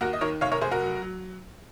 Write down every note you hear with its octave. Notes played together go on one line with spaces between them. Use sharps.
D#2 F#4 A#4
D#5
D#3 A#4 C#5
F1 C#5 F5
A#4 C#5
F1 G#4 C5
F#4 A#4
F#3
F#3